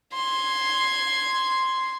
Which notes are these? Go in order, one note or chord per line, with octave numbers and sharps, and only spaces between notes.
C6 G#6